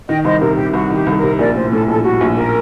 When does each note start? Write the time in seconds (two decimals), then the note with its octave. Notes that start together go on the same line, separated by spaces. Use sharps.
0.08 D#3 D#5 G5
0.24 C2 C5 D#5
0.41 C3 A#4
0.57 C3 G4
0.73 C2 F#4
0.90 D#3 G4
1.06 C2 A4
1.17 A#4
1.23 C3
1.39 A#1 A#4 D5
1.56 A2 C5
1.72 A2 A4
1.88 A#1 A4
2.04 G3 F#4
2.21 A#1
2.36 A#4